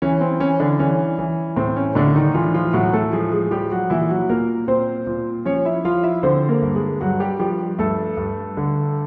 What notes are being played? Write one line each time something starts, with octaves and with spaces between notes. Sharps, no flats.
E3 C#4
C4
E3 C#4
D3 D4
E3 C#4
E3
A2 C4
C#4
A2 D3 D4
D#3 D#4
E3 F3 F4
F3 F4
A2 F#3 F#4
A3 A4
F3 G#3 G#4
G#3 G#4
F3 G3 G4
F#3 F#4
A#2 E3 E4
F#3 F#4
A#2 A#3 A#4
A#2 C4 C5
A#2
F3 C#4 C#5
E4 E5
F3 F4 F5
E4 E5
D3 C4 C5
A#3 A#4
G2
G#3 G#4
G2 F#3 F#4
G3 G4
F3 G3 G4
G2 A3 A4
G2
D3